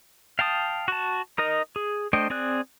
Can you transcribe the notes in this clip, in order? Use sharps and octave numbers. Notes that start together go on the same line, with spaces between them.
F5 G5 A5 D#6
F#4 A5
D#4 A#4 D#5
G#4
A3 D4 C5 D#5 G5
C4 G#4 D5 F#6